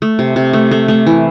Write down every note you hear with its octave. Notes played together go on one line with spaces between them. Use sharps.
A3
C3
C3
A3
A3
A3
E3